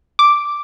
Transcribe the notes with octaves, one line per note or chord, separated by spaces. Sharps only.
D6